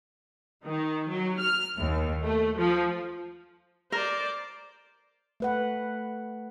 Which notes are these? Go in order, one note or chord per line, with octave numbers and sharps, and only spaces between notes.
D#3
F#3
F6
D#2
A3
F3
A#4 C5 D5
A3 B4 F#5